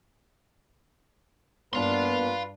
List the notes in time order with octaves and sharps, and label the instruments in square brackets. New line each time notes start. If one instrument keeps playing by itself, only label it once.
[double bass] G2 D4 [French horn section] A#3 B3 [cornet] B4 [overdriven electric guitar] F5 C6